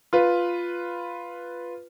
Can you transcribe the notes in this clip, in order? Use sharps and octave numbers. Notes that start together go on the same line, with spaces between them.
F4 B4